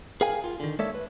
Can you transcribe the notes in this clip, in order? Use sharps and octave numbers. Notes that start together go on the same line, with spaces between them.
G#4 A#4 F5 G5 G#5
F4
D3 D#3
G#3 A#3 A4 C#5 D5 E5
B4